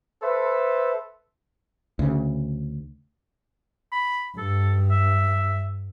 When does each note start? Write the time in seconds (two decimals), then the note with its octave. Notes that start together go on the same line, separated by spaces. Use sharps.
0.23 A4 B4 C5 E5
1.99 D2 C#3
3.92 B5
4.38 G2 A4
4.91 E5